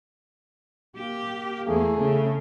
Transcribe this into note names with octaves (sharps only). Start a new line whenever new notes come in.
A#3 G4
E2 A3 A#3 G#4
C#3